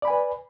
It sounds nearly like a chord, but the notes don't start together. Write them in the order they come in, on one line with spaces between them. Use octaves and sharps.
D5 B5 G#5 B4